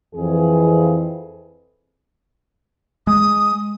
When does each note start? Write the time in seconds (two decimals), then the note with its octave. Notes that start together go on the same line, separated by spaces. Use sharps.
0.15 F2 E3 G#4
3.07 G#3 D#6